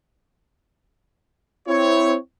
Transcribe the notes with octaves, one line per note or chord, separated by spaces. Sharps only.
C4 E4 C#5